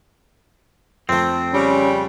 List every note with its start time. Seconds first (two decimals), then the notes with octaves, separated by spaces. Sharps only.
1.09 F2 A3 C4
1.53 C#3 G3 C#4